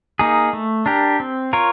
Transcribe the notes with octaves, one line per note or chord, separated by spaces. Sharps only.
A#3 D#4 G#4
A3
D4 G4 A#4
C4
F4 A#4 C#5